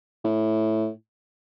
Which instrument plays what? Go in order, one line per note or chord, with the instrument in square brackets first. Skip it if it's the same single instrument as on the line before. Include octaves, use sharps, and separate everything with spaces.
[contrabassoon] A2